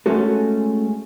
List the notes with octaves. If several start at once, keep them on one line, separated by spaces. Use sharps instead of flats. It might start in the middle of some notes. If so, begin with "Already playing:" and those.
G#3 A3 C#4 F#4 A4